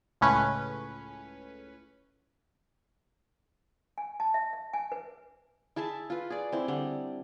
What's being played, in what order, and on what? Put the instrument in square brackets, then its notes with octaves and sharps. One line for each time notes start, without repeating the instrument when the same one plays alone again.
[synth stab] C#2 A2 C#4 B4
[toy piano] G#5
A5
E5
E5
G#5
B4
[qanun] E4 G#4 E5 A5
F4 B4
G#4 D5
C4 E4
D3 G3